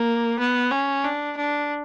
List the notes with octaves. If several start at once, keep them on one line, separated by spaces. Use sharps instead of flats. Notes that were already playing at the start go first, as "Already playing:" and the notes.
Already playing: A#3
B3
C#4
D4
D4